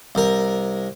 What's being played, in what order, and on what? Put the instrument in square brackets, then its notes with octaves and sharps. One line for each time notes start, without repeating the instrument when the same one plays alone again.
[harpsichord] C2 A#4